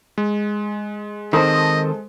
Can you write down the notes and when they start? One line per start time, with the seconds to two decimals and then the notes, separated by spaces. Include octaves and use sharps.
0.18 G#3
1.33 D#3 C4 A4 C5 D#5 D#6